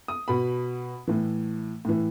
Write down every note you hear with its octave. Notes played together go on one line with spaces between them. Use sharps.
D#6
B2 B5
A2 E3
A2 E3